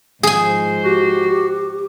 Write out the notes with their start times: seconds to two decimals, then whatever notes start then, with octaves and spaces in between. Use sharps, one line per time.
0.23 G#2 F3 G#4 C5 G#5
0.84 F#4 G4